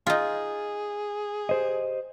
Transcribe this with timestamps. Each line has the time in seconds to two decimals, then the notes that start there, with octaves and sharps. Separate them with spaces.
0.07 D#4 F4 G#4
1.49 G4 C5 D#5